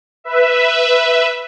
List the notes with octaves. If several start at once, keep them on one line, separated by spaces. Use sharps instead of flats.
B4 E5